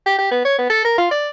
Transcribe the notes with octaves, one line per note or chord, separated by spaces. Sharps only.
G4
G4
B3
C#5
B3
A4
A#4
F4
D5